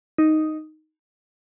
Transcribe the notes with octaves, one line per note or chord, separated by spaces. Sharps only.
D#4